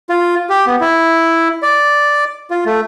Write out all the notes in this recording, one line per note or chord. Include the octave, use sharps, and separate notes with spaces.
F4
G4
B3
E4
D5
F4
A3